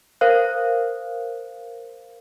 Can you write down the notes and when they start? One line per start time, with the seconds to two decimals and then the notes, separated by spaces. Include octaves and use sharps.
0.21 A#4 C5 F5 F#6